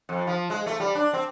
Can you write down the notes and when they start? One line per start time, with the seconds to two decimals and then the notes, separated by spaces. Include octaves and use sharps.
0.09 F2
0.27 F3
0.50 G#3
0.66 A3
0.80 G3
0.95 D4
1.13 C4